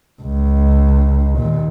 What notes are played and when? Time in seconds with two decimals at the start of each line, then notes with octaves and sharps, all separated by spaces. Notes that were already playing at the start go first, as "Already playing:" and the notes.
0.21 C#2
1.36 D#2 A#2